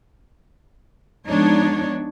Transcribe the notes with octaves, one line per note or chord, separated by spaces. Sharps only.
F3 G#3 B3 D4 D#4 C#5